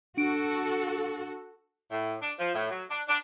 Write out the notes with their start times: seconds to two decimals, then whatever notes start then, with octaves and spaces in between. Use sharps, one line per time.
0.17 D4 F#4 A4 D7
1.91 A2
2.21 D4
2.39 F3
2.55 A2
2.71 F#3
2.90 D4
3.08 D4